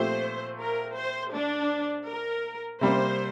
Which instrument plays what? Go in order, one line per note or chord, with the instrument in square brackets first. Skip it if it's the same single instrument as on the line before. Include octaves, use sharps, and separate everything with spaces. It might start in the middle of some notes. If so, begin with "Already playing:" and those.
Already playing: [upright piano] A#2 F3 A3 C4 G4 [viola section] C5
[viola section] A#4
C5
D4
A#4
[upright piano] C3 G3 A#3 [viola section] C5